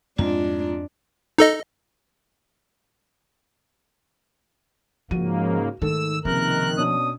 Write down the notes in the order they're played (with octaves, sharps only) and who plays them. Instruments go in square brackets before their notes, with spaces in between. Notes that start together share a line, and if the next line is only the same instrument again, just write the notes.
[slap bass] F2 C4 [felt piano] G#2 [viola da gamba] D4 [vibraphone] F4
[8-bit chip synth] D#4 A4 D#5
[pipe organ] G#2 C#3 A#3 [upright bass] F3 [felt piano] F#4 D#7
[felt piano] G#2 A3 A4 [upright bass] D#3 [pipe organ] E6
[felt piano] C#2 C3 [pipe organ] D#3 F#6 [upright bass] F3 A#3 [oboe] A#4
[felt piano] B2 C#4 D4 [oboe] D#6